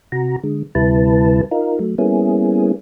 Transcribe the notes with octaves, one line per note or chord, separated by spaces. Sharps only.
C3 F#4 A#5
D3 G#3
D2 C3 G3 E4 B4 A5
D#4 F4 A#4
F#3 A3
G3 A#3 B3 C#4 E4 G#4